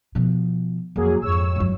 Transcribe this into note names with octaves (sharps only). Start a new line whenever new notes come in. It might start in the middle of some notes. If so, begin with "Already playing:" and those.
B2 F3
F2 F#3 A#3 G#4
F2 G#2 C#5 E6
G2 F#3